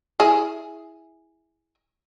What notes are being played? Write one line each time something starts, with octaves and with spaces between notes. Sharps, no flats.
E4 G#4